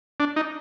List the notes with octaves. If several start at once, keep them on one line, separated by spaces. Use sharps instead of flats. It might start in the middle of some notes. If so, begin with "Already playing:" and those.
D4
D#4